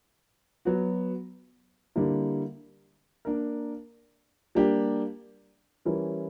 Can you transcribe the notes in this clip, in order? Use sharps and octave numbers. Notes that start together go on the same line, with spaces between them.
F#3 B3 F#4
D3 G3 A#3 E4
A#3 D4 A#4
G3 A#3 D4 G4
E3 G3 C#4 E4 A#4